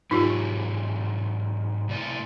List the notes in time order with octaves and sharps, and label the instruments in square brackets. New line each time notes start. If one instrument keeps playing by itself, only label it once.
[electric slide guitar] G#2 F#3 [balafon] D#4 F4 G4
[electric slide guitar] A2 C3 D5